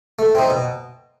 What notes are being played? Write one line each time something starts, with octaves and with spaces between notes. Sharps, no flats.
A3
C4 D#4
B2